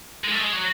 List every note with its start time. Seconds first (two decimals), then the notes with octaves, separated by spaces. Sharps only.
0.24 G#3
0.31 A3
0.39 G#3
0.53 F#3